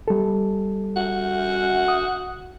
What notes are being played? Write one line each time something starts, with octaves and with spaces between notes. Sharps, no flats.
G3 A4
F#4
D#6